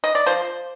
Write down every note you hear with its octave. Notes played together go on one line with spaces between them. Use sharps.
D#5
D5
F3 C5